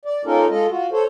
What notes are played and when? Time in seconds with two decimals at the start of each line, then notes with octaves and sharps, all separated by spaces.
0.05 D5
0.25 A#3 C#4 D#4 F4 A4 A#4
0.50 G#3 F4 A4 D#5
0.69 F4 F#4
0.91 A4 C5 C#5